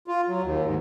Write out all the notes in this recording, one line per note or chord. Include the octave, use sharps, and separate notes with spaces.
F4
F#3
D#2
G#2